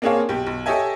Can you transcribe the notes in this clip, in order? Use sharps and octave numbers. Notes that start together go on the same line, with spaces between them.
A#3 C4 D4 G#4 C#5 F5
B1 G4
B1
G4 A4 C#5 D#5 E5 G#5